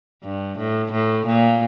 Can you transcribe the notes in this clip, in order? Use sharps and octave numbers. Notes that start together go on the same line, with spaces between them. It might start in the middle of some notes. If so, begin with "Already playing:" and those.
G2
A2
A2
A#2